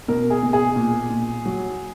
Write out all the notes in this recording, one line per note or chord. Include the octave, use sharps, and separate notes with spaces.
B2 A#4
G#4
B2
G#4
A#2
A#2
F#3